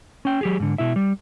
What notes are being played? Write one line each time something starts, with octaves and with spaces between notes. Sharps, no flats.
C#4 G5
F#3 G4 G#4
G#2 D3
B2 E4 E5
G3